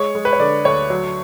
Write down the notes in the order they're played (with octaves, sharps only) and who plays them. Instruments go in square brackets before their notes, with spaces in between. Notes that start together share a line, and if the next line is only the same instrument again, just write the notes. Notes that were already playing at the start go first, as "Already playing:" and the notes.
Already playing: [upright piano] G#3 C#5
G#3
B4
C#5
D3 D5
D2 C#5
F#3